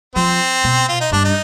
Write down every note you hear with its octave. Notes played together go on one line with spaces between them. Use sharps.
F3 C4
B2
F4
D#4
G2 D4
D#4